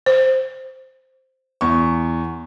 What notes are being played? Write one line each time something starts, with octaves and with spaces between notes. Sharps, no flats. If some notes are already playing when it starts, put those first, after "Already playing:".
C5
E2 C#6